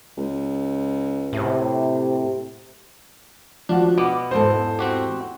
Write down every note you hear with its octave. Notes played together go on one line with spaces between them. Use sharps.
C#2
A2 C3
F3 D4 F#4
B2 B3 D6
E2 G#2 A4 C5
C4 F#4 G4